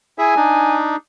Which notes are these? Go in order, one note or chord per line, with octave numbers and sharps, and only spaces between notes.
E4 G#4 E5 G#5
D4 D#4